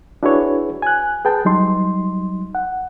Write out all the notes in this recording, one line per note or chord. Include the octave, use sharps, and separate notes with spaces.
D4 E4 F#4 G#4 B4 C#5
G#5 F#6
G#4 B4 G5 A5
F#3 G3 D#4 C6
F#5